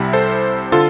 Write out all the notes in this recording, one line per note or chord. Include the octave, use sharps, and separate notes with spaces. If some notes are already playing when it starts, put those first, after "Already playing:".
Already playing: C2 C3 G3 E4
A4 C5
D3 F4 A4